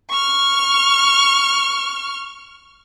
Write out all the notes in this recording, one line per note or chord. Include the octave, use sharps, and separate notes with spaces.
C#6 F6